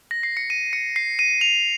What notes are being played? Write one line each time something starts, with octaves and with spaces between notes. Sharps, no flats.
A#6
C7
C#7
D#7
C#7
C7
D#7
F7